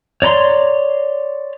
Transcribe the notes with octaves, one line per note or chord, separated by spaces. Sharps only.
C#5 D5 A#5 C6